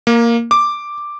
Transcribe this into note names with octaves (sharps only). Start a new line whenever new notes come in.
A#3
D6